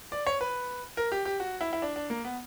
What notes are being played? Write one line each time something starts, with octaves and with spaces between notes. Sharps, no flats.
D5
C#5
B4
A#4
G4
G4
F#4
E4
E4
D4
D4
A#3
B3